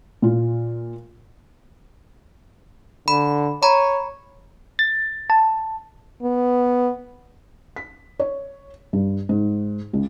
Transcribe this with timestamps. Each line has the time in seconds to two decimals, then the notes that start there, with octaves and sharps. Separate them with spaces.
0.22 A#2 F4
3.08 D3 B5
3.63 C#5 A#5 B5
4.79 A6
5.30 A5
6.23 B3
7.76 B6
8.19 C#5
8.93 G2
9.29 G#2
9.93 C#2